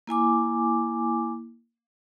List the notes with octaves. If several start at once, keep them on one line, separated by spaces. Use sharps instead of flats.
A#3 E4 G#5 D6